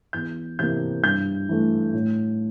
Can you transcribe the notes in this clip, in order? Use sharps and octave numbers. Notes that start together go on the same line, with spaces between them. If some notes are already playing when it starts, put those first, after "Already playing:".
E2 G6
C3 E3 A#3 G6
G2 G6
E3 A3
A2